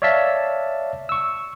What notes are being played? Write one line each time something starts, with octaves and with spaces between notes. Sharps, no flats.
C#5 D5 E5 F5 A5 B6
C#6 E6